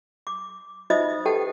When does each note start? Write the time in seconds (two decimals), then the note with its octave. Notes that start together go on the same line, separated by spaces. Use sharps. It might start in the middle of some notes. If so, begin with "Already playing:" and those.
0.27 D6
0.90 D#4 F4 C5 D#5 E5 D#6
1.25 G4 A4 B4 F#5 G5 A5